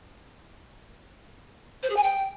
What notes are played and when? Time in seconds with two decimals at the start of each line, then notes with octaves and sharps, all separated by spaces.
1.83 C5
1.90 G#4
1.96 G#5
2.03 G5